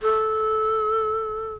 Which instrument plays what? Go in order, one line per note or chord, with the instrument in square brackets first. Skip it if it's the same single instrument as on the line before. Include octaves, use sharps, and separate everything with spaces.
[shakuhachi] A4